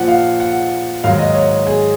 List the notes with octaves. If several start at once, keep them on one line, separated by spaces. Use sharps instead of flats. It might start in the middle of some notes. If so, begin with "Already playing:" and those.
Already playing: A#2 F3 F#5
F5
F#5
G#2 D#3 F#3 F5
D#5
C#5
G#4